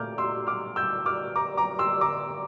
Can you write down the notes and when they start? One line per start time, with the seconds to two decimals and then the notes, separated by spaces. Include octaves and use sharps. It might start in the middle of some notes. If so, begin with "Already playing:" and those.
Already playing: A#2 A3 D6 F6 G6
0.18 C6 E6
0.47 D6 F6
0.76 E6 G6
1.06 D6 F6
1.36 A#5 D6
1.57 A#5 D6
1.79 C6 E6
2.01 A#5 D6